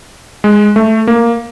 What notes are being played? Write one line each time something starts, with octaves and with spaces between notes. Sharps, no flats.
G#3
A3
A#3